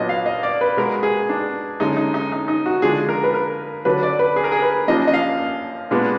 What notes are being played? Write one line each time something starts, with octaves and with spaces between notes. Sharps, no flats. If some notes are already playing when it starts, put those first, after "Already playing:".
Already playing: A#2 F#3 B3 D4 D#5
F5
D#5
D5
B4
B2 G#3 B3 A#4
G#4
D4
F#2 D3 G#3 D#4
D#4
D#4
D#4
D#4
F#4
D3 F3 G#3 D4 G#4
A#4
B4
A#4
D3 F#3 D4 B4
D5
B4
G#4
A#4
G#4
B4
F#2 F3 A#3 D4 D#5
D#5
F5
A#2 G#3 B3 D4